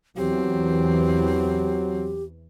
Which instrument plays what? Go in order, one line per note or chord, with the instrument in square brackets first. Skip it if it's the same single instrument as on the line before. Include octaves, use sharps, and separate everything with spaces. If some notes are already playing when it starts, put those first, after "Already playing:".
[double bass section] E2 E3 [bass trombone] F#3 [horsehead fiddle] C4 [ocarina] G4